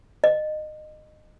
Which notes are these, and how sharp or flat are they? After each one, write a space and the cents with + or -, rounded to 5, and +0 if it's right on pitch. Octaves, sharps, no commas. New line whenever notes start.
D#5 -20